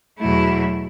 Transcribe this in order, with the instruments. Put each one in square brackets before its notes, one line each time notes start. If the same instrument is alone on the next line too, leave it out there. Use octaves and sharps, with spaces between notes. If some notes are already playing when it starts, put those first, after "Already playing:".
[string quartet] E2 B2 F#3 A3 E4